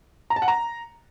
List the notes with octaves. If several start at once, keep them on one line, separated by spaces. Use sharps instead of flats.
A#5
A5
F#5
A#5